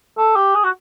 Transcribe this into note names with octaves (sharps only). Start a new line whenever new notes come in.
A4
G4
G#4
F#4